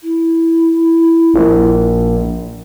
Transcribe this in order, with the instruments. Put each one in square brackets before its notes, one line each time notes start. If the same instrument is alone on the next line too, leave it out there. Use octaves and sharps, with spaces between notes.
[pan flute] E4
[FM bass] A#1